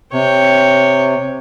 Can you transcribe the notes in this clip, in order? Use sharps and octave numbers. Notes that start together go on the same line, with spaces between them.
C3 C#5 G5